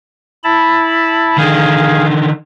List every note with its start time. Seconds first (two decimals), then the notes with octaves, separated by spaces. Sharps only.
0.44 E4 A5 B5
1.38 D3 D#3 G#4 F5